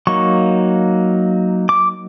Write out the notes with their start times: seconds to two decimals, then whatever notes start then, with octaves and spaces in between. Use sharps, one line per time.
0.07 F#3 A#3 D#4 C#6
1.69 D6